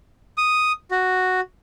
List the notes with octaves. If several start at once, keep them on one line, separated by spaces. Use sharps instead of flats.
D#6
F#4